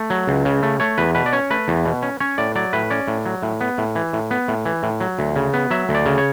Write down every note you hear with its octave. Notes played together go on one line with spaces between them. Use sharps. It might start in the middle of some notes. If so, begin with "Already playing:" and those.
Already playing: A3
F#3
C#2
C#3
A3
A3 C#5
E2 B4
B2 B4
D5
C#4 C#5
A3 B4
E2
B2
C#4
C#4 C#5
A2 D5
F#3 D5
A2 B4
C#4 D5
A2
F#3
A2
B3
A2
E3
A2
B3
A2
E3
A2
F#3
D2
C#3
B3
F#3 E5
D2
D5
C#3
C#5